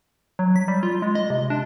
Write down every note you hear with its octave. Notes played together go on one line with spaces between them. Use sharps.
F#3
B6
G3
F4
G#3
D#5
C3
D4